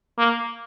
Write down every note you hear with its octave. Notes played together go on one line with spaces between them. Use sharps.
A#3